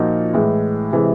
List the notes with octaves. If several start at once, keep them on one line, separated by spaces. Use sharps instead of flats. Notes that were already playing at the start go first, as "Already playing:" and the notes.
Already playing: A#2 F3 A#3 D#4 F#4
A2 E3 G#3
C3 E3 G#3